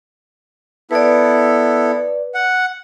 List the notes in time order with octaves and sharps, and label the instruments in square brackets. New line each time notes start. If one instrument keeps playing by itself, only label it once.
[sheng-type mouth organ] B3 E4 A4 [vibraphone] B4 D5
[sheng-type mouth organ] F#5